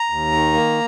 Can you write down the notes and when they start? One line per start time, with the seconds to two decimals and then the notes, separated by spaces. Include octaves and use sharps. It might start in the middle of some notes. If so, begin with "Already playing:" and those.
Already playing: A#5
0.10 D#2
0.32 D#3
0.53 A#3